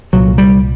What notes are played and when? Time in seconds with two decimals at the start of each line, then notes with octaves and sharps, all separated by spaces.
0.13 C2 A#2 F#3
0.38 G3